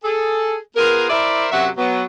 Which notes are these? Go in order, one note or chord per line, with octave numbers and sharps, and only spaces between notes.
G#4 A4
B3 F4 G#4 A#4
E4 A#4 C5 D5 E5
F#2 C3 F#3 F#4 E5 F#5
F#3 B3